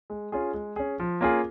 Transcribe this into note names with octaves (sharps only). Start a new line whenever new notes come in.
G#3
C#4 F4 G#4
G#3
C#4 G#4
F3
A#3 C#4 F4 G#4